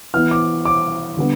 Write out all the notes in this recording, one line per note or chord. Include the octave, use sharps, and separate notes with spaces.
E3 B3 E4 F6
D6
D6
D3 G3 B3